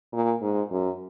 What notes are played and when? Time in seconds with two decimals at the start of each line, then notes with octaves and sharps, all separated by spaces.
0.13 A#2
0.41 G#2
0.71 F#2